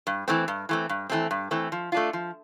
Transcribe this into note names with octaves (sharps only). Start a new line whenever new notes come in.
G2
E3 A3 C4
G2
E3 A3 C4
G2
E3 A3 C4
G2
E3 A3 C4
F3
A3 D4 F4
F3